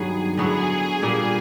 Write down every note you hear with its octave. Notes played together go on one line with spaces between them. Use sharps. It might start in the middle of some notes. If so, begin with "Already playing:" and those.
Already playing: G2 D#3 F#3 B3 G#4
D3 F#3 B3 E4 G#4
A#2 G3 A#3